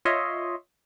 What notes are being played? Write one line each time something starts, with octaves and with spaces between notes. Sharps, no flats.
F4 C#5 D#5 E5 C6